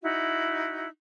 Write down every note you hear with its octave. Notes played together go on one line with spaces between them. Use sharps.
D#4 E4 F#4